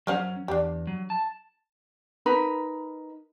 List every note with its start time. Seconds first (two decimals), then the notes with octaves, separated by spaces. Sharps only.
0.07 F#3 C#4 A#4 C5 F#5
0.48 E2 D4 G4
0.87 F#3
1.10 A5
2.26 D#4 A#4 B4 B5